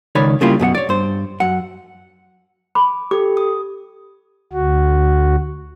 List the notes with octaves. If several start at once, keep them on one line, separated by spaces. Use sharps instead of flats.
C#2 D#3 C#5 D5 B5
C#3 G3 A#3 E4 F4
F#2 B2 A4 F#5
C#5 D5
G2 C5
F#2 F#5
B5 D6
G4 A4 D6
D#6
D2 F#4